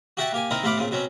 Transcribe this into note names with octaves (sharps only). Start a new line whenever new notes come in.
F#4 G4 E5 F#5 G5 A5
A#3 G4 G#5
C4 D#4 E4 A#4
A1 A3 B3 F5 B5 D6
A#2 C#3 C4
B2 F#3 C4 C#4